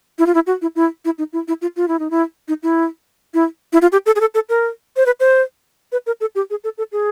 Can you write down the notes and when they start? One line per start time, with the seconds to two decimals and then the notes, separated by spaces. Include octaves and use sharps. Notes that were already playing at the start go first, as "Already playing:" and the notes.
0.19 E4
0.26 F4
0.35 E4
0.47 F#4
0.62 E4
0.76 E4
1.05 E4
1.18 D#4
1.33 E4
1.48 E4
1.62 F4
1.77 F4
1.88 E4
1.99 D#4
2.11 E4
2.48 D#4
2.63 E4
3.34 E4
3.73 E4
3.82 F4
3.92 G4
4.06 A4
4.16 G#4
4.20 A4
4.35 A4
4.49 A#4
4.97 C5
5.06 B4
5.20 C5
5.92 B4
6.07 A#4
6.21 A4
6.35 G4
6.50 G#4
6.64 A4
6.78 A4
6.92 G#4